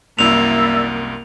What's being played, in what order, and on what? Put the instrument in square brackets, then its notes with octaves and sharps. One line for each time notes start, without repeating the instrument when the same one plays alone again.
[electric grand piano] C2 F#2 [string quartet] A#3 [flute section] E4 D5 E6 [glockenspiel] F7